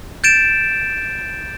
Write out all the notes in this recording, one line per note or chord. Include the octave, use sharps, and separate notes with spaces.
G6 A6 D7 E7